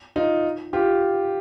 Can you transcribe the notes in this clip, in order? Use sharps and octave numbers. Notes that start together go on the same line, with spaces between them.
D#4 F4
F4 G4